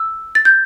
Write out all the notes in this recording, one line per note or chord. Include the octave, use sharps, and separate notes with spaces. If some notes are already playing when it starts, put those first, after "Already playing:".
Already playing: E6
A6
G6